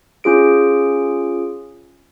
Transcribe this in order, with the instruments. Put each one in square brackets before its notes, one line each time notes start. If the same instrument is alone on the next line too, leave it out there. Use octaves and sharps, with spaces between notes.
[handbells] C#4 F4 G#4 D7